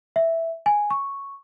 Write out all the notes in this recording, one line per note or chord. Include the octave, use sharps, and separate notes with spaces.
E5
G#5
C#6